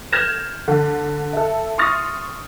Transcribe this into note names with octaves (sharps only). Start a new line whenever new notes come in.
F6 G6 G#6 A#6 E7
D3
A4 E5
C6 C#6 D#6 F6 A6 A#6